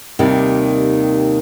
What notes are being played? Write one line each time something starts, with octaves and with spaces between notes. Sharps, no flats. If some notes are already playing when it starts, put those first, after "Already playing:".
D#2 C3 D#3 G3